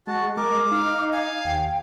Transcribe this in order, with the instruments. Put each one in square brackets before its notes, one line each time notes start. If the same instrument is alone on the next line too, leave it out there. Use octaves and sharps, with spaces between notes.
[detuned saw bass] G#3 [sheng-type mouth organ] F#4 A5
[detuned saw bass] G#3 [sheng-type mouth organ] A#4 [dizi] D6
[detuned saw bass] D#4 [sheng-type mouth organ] F5
[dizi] F5 [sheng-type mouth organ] G#5
[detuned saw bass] D#2 [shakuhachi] G5